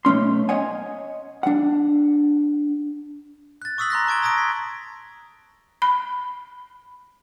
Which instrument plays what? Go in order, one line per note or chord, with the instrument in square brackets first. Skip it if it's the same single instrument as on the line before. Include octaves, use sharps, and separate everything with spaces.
[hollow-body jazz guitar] B1 A3 C#4 C6
C#5 D#5 F#5 G#5
D4 F#5
[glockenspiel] F#6 A6
C#6 D#6 E6 B6 F#7
A#5 C6 F#6 A#6
A5 C#6 G#6 D7 G7
A#5 D#6 G#6 A#6 D7
B6
[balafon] B5